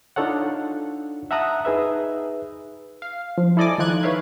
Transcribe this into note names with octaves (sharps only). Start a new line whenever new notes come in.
D4 D#4 F4 A4 C#5 F#5
E5 F#5 A5 A#5 D#6 F#6
D#4 G#4 B4 E5
F5
F3
E4 A4 D5 D#5 G#5 D6
D#3 F3 D#4 F4 F#6 G#6
B4 C#5 E5 F5